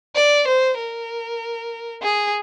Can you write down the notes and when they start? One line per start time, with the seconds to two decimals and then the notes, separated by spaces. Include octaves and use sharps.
0.16 D5
0.48 C5
0.78 A#4
2.02 G#4